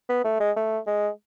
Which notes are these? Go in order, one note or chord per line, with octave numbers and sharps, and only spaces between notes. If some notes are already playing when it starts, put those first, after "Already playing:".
B3
A3
G#3
A3
G#3